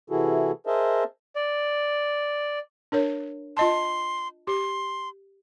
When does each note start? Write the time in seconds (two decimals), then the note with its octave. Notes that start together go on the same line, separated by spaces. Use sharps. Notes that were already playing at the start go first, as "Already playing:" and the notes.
0.10 C3 E3 E4 F#4 G#4 A4
0.67 G#4 A#4 C5 D#5 E5 A5
1.36 D5
2.92 D4 A#4 C#5
3.57 F4 D#5 A5 C6
4.47 G4 C6